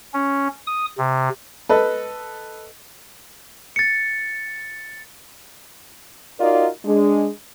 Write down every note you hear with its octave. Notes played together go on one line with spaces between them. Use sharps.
C#4
D#6
C3
A4 B4 D#5
A6 C#7
D#4 F4 F#4 A#4 D5 D#5
G#3 D4